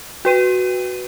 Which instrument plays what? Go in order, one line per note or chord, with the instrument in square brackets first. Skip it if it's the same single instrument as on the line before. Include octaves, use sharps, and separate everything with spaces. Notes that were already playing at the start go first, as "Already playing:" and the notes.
[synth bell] F#4 B4 D#7